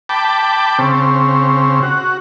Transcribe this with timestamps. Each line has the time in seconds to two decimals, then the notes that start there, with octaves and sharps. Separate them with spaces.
0.09 G5 A5 B5 D6
0.79 C#3 C4
1.82 F#4